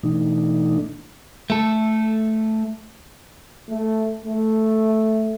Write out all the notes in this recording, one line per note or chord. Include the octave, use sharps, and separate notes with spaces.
B2 E3 A3 D4 D#4
A3 A4
A3
A3